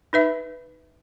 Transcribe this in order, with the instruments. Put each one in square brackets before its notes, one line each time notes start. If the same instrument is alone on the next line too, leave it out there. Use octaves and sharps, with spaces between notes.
[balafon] D#4 B4 E5